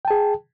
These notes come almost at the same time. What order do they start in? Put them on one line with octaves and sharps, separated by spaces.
G5 A5 G#4